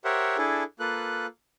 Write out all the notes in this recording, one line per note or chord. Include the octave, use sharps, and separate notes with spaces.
G4 A#4 C5 C#5 E5 F#5
D4 E4 G#4 A4
A#3 F4 A4 B4 F#6